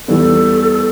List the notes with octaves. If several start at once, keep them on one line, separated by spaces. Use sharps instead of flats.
E2 E3 G3 B3 A4